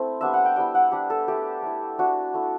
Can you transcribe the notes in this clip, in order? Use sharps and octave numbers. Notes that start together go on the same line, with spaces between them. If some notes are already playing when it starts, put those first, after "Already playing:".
Already playing: A3 C4 E4
G3 B3 D4 E5
F#5
G5
G3 B3 E4 G5
F#5
G3 D4 G4
A4
A3 E4 G4
A3 E4
A3 D4 F#4
A3 E4